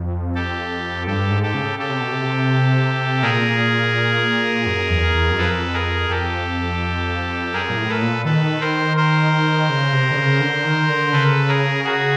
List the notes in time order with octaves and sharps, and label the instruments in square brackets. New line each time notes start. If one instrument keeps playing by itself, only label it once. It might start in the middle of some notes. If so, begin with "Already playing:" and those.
Already playing: [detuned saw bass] F2
[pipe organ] G4 A4
[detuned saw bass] G2 [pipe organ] G4 A4
[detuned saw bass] G#2
[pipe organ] G4 A4
[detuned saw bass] C#3
[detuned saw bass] C#3 [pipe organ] G4 A4
[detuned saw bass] C3
B2
C3
[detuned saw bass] A#2 [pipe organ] G#4 A#4
[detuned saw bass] F#2
E2
E2
F#2
[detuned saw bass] F2 [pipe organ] A4 B4
[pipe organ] G#4 A#4
[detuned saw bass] F2 [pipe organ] G4 A4
[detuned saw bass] F#2 [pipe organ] G#4 A#4
[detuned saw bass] A#2
A2
[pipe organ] A4 B4
[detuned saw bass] A#2
[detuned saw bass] D#3 [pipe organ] A4 B4
[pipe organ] A#4 C5
A#4 C5
[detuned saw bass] C#3
C3
D3
C#3
D3
D#3
D3
[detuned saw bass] C#3 [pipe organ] A4 B4
[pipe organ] G#4 A#4
F#4 G#4